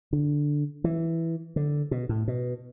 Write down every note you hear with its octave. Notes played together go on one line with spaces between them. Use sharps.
D3
E3
D3
B2
A2
B2